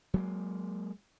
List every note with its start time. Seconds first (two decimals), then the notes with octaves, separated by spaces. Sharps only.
0.14 F#3 G#3 A#3